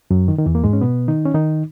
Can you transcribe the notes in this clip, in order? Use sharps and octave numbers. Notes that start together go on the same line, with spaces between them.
F#2 F#3
D#3
D#3
E2 E3
A#3
G#2 G#3
C#4
B2 B3
D#3 D#4
C#4
D#3 D#4